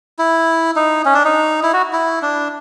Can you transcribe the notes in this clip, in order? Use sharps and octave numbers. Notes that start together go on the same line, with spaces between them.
E4
D#4
C#4
D4
D#4
E4
F#4
E4
D4